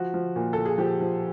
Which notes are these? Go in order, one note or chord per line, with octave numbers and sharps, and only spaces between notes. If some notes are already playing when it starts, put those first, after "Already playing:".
Already playing: F3 F#4
F3
A#2
A#2 A4
G#4
F3 G4
F3